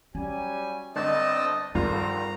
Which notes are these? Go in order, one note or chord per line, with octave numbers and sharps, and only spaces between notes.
F#3 G3 C#4 F4 G#5
G1 C4 D5 D#5 A5
G#1 G2 D3 F3 G3 C4 F4 A#5